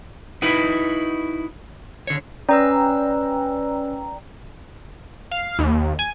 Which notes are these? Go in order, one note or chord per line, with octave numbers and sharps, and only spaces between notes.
D#4 E4 F#4 B4
D3 C#5
C#4 B4 D5 G5 A#5 E6
F5
D#2
G#5